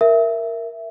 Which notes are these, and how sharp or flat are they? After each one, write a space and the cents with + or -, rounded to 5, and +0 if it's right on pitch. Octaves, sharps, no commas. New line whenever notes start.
A#4 +0 E5 +10